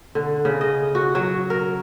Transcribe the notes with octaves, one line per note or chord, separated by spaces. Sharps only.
D3
C#3
D#5
F#4
F#3
A#4